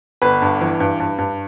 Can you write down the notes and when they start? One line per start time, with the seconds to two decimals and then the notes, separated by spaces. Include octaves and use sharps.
0.22 G1 B4
0.42 G2
0.61 E3
0.80 G2
1.00 G2
1.18 G2